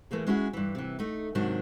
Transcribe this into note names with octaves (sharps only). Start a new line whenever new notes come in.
E3 A3 A#3 G#4
G#3 C#4 E4 F#4 G#4
G2 E3
C3 E3
A3 D#4
G#2 C3 D#3 F#3 D4